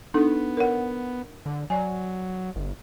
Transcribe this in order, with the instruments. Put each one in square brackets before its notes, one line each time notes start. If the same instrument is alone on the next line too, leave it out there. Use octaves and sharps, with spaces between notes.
[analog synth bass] B3 [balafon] D4 D#4 A4
[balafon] A#4 C#5 F#5
[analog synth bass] D3
[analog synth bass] F#3 [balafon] D5 G#5
[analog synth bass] G1